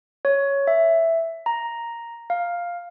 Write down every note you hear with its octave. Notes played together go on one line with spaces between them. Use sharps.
C#5
E5
A#5
F5